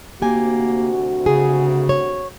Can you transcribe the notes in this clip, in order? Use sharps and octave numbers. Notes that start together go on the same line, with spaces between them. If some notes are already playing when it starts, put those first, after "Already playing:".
D2 C3 A#3 F#4 G4 G#5
C#3 G#4
C#5